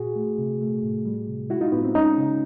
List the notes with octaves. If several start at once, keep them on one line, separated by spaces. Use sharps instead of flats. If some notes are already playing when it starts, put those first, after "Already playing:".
Already playing: A#2 F#4 G#4
A3
C3
A3
A2
G3
C3
G#3 E4 F#4
D#4 F4
A2 B3
C4
G#3 C#4 D#4
C#3